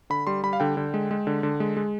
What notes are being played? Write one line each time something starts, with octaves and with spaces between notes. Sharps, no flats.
D3 B5
G3 C6
G3 B5
F5
D3 G5
D3
G#3
G#3
D3
D3
G#3
G#3